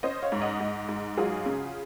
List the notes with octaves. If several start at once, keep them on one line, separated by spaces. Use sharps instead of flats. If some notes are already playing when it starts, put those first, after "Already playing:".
C#4 C5 D#5
C#5 F5
G#2
D#5 F#5
G#2
G#2
F#3 F4 G#4
C#3